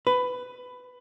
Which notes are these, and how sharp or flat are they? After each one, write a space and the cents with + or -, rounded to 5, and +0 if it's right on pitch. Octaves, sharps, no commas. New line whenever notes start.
B4 +15